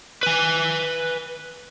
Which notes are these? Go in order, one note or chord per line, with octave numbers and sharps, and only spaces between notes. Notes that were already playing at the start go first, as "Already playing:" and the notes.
B4 G#5